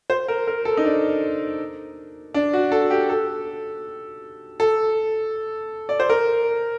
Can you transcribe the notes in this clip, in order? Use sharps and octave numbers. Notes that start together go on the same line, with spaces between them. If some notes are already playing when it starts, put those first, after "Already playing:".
C5
A#4
A#4
A4
D#4
D4
D4
F#4
A4
G4
A4
A4
D5
C5
A#4